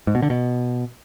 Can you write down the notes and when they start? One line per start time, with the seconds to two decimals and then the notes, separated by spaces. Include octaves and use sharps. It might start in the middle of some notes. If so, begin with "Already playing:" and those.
0.07 G#2
0.15 B2
0.22 D3
0.30 B2